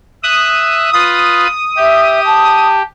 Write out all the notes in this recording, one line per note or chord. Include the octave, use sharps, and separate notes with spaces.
E5 D#6 F#6
F4 B4 D#6
G4 E5
A5